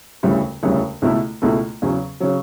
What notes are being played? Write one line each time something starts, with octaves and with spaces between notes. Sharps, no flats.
E1 D2 C#3 E3 G3
E1 D2 C#3 E3 G3
C#2 B2 A3 E4 A4
C#2 B2 A3 E4 A4
E2 C#3 F#3
C#3 F#3